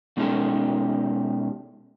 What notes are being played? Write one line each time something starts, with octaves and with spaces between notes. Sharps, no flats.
B2 G#3 C#4 D#4 G4 A4